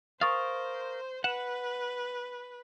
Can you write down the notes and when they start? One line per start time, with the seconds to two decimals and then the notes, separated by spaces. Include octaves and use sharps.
0.21 A#4 C5 F5 C#6 D#6 A6
1.24 B4 F#5 E7